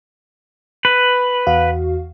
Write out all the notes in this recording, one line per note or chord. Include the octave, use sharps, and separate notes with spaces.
B4
E2 F#4 F5